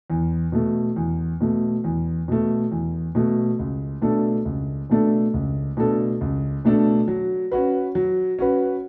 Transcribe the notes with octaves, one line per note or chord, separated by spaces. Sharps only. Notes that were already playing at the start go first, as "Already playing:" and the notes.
E2
B2 A3
E2
B2 A3
E2
B2 A3
E2
B2 A3
C#2
B2 A3 D4 A4
C#2
B2 A3 D4 A4
C#2
B2 A3 D4 A4
C#2
B2 A3 D4 A4
F#3
C#4 F#4 B4
F#3
C#4 F#4 B4